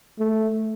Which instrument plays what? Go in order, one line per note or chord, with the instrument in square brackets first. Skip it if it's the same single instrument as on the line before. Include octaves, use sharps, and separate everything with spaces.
[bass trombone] A3